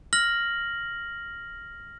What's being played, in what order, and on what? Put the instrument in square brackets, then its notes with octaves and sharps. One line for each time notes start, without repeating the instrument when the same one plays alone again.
[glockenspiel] F6 A#6 F#7